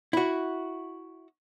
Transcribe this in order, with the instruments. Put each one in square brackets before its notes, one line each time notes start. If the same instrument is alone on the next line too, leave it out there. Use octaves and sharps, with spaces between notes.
[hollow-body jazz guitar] E4 F#4